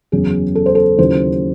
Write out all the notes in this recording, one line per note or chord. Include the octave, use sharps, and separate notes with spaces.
F#1 E2 C#3 F#3 G#4
A4
C5
A4
D#2 C#3 F#3 C#4 E4 C5